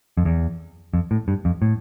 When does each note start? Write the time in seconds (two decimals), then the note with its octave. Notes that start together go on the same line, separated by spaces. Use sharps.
0.17 F2
0.25 E2
0.94 F2
1.11 A2
1.28 G2
1.45 F2
1.62 A2